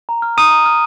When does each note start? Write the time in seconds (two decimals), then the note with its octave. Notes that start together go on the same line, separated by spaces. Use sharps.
0.09 A#5
0.22 F6
0.37 A#5 D#6 D#7
0.51 A#5
0.66 F6